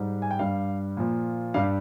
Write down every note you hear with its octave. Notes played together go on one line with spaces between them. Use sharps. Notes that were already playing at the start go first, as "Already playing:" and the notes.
Already playing: G#2 G3
G#5
G5
G2 G3 F5
A#2 F3
G2 G3 F5